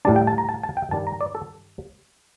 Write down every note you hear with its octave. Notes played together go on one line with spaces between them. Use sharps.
A2 G3 D4 A5
G5
A5
A#5
A5
A5
G5
G2 D#3 G3 D4 A5
A#5
D5
A4